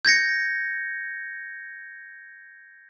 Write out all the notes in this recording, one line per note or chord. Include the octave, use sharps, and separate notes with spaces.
G6 G#6 A#6 C#7